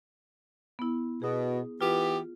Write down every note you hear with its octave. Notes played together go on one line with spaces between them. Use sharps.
B3 E4
B2 G#4 D#6
E3 B3 F4 G4